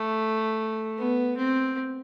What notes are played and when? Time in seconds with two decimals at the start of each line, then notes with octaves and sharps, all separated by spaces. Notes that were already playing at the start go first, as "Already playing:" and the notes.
Already playing: A3
0.98 B3
1.37 C4